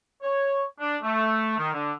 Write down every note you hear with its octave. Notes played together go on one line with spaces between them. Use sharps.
C#5
D4
A3
D#3
D3